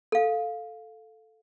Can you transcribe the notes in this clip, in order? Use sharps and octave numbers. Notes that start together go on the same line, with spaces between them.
A4 F5